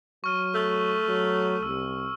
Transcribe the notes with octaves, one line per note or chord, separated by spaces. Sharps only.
F#3 C#6 F6 D#7
A3
F#3
C2 E6